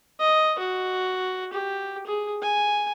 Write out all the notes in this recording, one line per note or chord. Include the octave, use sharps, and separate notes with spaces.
D#5
F#4
G4
G#4
G#5